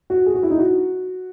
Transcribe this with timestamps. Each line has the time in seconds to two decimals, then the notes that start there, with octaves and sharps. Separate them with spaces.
0.10 F#4
0.26 G#4
0.35 F#4
0.43 E4
0.50 D#4
0.59 F#4